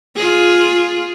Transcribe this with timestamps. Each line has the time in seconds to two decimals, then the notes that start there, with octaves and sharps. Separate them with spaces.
0.16 F4 G#4